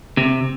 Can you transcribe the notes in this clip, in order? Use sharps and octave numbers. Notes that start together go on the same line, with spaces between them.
C3